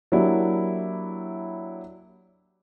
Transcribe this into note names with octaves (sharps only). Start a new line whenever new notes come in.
F#3 A#3 D4 E4 G4